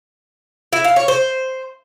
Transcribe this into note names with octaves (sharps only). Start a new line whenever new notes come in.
E4
F5
C#5
C5